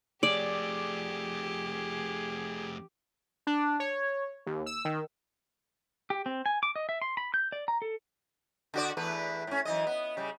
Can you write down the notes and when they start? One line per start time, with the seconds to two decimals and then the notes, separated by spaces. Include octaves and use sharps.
0.23 F2 A3 G4 G#4 D5
3.47 D4
3.80 C#5
4.47 D#2
4.66 E6
4.85 D#3
6.10 G4
6.26 C4
6.46 G#5
6.63 D6
6.76 D#5
6.89 E5
7.02 C6
7.17 B5
7.34 G6
7.52 D5
7.68 A#5
7.82 A4
8.74 D3 F#4 D5
8.97 E2 A3 B4
9.47 A2 C#4
9.65 F#2 E3 D#5
9.87 B3
10.17 C#3 G3